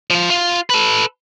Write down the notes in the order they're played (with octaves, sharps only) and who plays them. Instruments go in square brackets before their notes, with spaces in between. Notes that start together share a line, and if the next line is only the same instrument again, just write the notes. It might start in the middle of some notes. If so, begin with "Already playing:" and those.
[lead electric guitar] F3 F4
F4
A4 B4